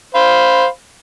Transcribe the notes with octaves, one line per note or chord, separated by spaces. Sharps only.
C5 F5 B5